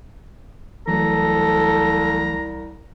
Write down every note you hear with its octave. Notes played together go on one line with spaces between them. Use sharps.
C2 E3 F#3 A3 A4 A#5